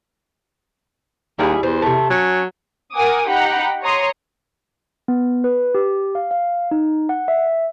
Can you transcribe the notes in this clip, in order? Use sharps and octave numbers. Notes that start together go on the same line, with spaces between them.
D#2 G3 E4 G#4
E2 C5
C3 A3
F#3 C#4
A#4 F#5 G#5 D6 D#6
D#4 G4 F#5 G5 A#5 B5
C#5 A#5 C6 D#6 C#7
B3
B4
G4
F5
F5
D#4
F#5
E5